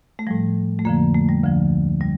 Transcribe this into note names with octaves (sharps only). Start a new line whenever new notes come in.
A3
A2 F3 G3
A3
F2 D3 F3 A#3
A3
G3
D2 D3 F3
G3